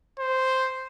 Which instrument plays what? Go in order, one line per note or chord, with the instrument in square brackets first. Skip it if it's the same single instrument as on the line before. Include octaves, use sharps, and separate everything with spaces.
[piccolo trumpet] C5